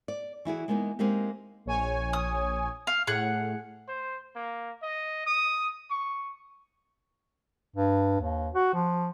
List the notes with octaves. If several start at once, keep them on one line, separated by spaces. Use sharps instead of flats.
D5
E3 E4 F#4 G#4
G#3 A#3 B3 D4 D#4
G#3 A#3 C4 D#4 G4
A#1 C#5 G#5
D#6
F5
A2 G#4 F#5
C5
A#3
D#5
D#6
C#6
G2
D#2
F#4
F3